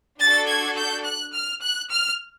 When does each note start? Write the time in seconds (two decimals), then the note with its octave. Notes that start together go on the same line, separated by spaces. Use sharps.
0.20 D4 F#4 A4 A6
0.48 G#6
0.77 G6
1.05 F#6
1.33 F6
1.62 F#6
1.90 F6